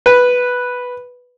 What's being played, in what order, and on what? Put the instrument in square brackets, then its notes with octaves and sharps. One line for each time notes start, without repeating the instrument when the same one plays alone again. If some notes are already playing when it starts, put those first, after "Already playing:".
[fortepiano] B4